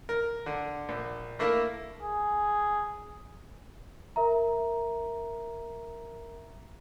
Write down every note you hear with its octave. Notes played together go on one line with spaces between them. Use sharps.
A#4
D3
A#1
A3 A#3 E4 A#4
G#4
A#4 E5 A#5